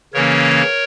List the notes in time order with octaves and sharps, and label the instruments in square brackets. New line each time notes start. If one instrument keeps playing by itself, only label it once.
[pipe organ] C#3 E3 A#3 C#4 A#4 C#5